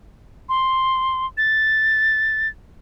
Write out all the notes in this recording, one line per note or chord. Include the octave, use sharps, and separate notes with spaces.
C6
A6